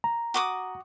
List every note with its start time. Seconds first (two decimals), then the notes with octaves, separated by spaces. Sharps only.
0.04 A#5
0.34 F#4 D6 D#6